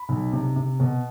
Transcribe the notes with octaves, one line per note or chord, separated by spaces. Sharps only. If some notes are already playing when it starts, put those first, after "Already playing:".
Already playing: B5
B1
C3
C3
B2